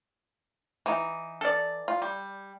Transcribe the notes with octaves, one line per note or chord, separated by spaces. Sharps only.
E3 D#4
A4 D5
F4
G3